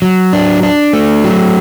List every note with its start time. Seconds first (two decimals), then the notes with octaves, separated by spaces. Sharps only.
0.02 F#3
0.33 D4
0.63 D4
0.93 A3
1.24 F#3